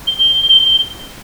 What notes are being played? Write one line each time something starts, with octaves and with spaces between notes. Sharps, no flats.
G7